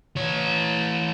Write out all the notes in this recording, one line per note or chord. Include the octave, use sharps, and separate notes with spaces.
E3 C#5